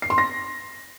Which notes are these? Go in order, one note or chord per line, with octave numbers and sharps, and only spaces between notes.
C7
C6
A#6